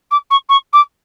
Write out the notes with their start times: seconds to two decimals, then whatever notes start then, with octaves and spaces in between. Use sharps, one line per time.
0.11 D6
0.30 C#6
0.49 C#6
0.73 D6